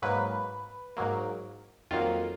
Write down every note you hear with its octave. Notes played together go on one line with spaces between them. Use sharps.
G#2 F#3 A#3 B4
G#2 F#3 A#3
F2 D#3 F#3 A#3 F4